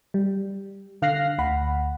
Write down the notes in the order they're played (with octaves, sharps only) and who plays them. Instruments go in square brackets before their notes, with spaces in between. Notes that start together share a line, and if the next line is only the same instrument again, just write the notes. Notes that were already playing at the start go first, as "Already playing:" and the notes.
[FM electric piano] G3
D3 F5 F6 F#6 A#6 C7
D2 F#5 B5